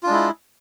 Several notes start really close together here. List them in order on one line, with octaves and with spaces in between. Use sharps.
F4 D4 G#3 E4